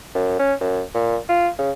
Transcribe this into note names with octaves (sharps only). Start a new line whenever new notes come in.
F#2
C#4
F#2
A#2
F4
C#3